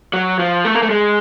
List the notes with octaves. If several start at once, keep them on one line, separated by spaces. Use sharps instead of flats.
F#3
F3
A3
A#3
A3
G#3